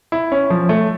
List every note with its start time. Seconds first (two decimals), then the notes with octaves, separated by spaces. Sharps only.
0.12 E4
0.32 C#4
0.50 F3
0.69 A3